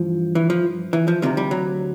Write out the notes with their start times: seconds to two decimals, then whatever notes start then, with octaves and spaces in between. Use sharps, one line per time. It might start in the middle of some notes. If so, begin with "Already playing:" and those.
Already playing: G2 E3 F3
0.35 E3
0.50 F3
0.93 E3
1.08 F3
1.22 D2 C3 D#3 F3
1.37 G3
1.51 F#3